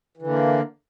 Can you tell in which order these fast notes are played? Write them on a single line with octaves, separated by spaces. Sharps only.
E3 D3 A#3